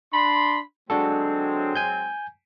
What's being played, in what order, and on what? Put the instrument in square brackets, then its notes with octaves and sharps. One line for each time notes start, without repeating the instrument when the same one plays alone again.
[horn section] D4 B5 C6
[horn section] F#3 G#3 C4 [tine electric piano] D4 F#4 A4
[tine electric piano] G#5 G6